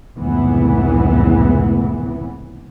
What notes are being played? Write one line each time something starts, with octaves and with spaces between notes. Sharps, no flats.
F1 C#2 A2 E3 B3